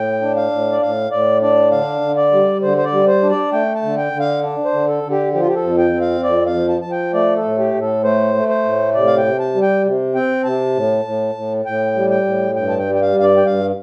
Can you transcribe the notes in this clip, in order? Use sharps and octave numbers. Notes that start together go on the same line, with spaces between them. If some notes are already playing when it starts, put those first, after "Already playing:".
Already playing: A2 G5
D4
F5
A2
D5
A2 F5
A2 D5
D4 D5
D3 F5
D3
D5
G3
D3 C5
C5
D5
G3
C5
D4
D5
A3 G5
A5
D3
G5
D3
F5
D4
C5
D3
A4
D3
G4
F3 G4
F4
G4
A4
F2
G5
C4
F5
F2 D5
F5
F3
A5
F3 A5
G5
A3 D5
A4
A2
G4
A2
A4
A3 C5
A3
C5
A2
C3 D5
F5
G5
C3
A5
G3
G5
C3
C4 G5
C3 A5
A2
A2
A2
A2 G5
G3
G5
A2
G2 G5
A5
G5
G3
G5
F5
G2 F5
D5
G5
G2 F5